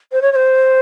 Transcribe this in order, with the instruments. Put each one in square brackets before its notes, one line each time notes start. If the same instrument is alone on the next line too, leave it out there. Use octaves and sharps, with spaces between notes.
[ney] C5
C#5
C#5
C5